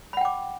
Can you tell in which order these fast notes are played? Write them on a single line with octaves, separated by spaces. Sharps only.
B5 F#5 G5 D6